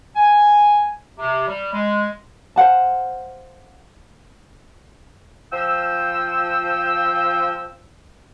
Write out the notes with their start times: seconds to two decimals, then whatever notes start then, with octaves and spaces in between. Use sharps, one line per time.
0.16 G#5
1.18 C3
1.48 G3
1.73 G#3
2.56 C5 F5 F#5 A5
5.52 F3 G5 E6